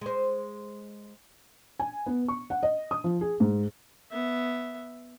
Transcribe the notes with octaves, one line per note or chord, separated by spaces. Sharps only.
G#3 C5
G#5
B3
C#6
F#5
D#5
D#6
F3
G#4
G#2
B3 E5